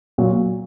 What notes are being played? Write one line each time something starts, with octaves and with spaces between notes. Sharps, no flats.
A#2 F#3